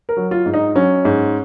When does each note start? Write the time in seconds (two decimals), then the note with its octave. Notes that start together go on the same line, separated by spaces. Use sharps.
0.09 A#4
0.17 F#3
0.31 F4
0.46 G#2
0.54 D#4
0.75 F#3 C#4
1.05 G#2